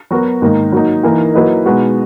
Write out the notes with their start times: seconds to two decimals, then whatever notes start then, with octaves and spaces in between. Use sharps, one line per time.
0.11 F#3 B3 F#4 A#4
0.42 G#2 D#3 A#3 D#4
0.72 F#3 A#3 D#4
1.03 E3 A#3 D#4 A#4
1.34 F#3 A#3 E4 B4 D#5
1.65 B2 G#3 B3 D#4 F#4